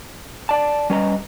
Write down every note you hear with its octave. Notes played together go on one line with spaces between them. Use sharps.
D5 A5
G3 C#4 B4 D#5 A#5